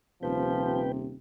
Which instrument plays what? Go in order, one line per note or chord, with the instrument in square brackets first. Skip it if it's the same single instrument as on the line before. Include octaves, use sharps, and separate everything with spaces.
[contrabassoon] D#1 [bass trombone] C3 [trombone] F3 [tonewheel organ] B4 G5